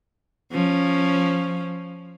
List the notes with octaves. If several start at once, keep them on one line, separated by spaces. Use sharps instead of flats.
F3 C#4